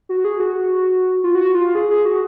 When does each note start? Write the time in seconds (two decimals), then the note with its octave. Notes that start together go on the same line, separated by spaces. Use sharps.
0.09 F#4
0.25 G#4
0.40 F#4
1.24 F4
1.35 F#4
1.55 F4
1.75 G#4
1.90 G#4
2.05 F#4